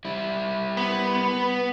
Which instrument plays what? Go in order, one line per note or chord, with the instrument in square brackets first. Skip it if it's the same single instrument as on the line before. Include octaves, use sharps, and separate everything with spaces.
[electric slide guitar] G3 E4
[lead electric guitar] B3